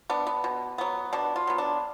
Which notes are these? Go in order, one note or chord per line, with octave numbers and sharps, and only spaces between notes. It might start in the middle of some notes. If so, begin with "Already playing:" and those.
B3 D4
B3
B2
F#3 B3
B2 D4
F4
F#3 B3
D4